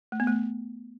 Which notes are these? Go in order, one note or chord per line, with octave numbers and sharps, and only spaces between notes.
A3
B3
A3